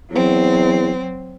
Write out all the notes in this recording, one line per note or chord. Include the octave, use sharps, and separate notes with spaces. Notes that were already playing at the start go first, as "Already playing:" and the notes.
E2 F#3 C4